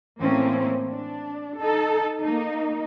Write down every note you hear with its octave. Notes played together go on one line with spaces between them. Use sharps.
A2 E3 A#3 C4 C#4
D4
D#4 A4
A#3 D#4